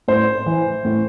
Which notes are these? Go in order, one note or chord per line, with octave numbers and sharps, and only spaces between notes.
A2 C5
E3
A2